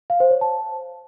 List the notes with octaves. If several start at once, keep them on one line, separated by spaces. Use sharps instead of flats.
F5
C5
C#5
A5